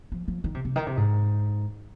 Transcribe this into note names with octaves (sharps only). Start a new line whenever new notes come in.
F3
F3
D#3
C3
C3
D#3
C3
G#2